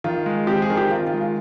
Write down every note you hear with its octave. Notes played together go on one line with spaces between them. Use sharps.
D#3 F4
G#3
C4 G4
G#4
D#3
G4
D#3 F4
F4
G#3
F4